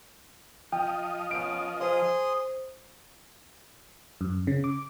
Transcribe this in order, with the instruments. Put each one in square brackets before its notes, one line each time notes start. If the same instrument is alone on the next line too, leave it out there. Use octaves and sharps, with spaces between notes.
[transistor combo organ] F3 D#5 [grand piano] G5
[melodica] B3 C#4 [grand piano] D7
[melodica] G#4 C6 D#6 [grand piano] C5
[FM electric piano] F#2
C#3
D6